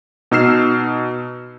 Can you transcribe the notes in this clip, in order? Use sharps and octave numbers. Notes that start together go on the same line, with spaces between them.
B2 D#4 E6 F6 C7 E7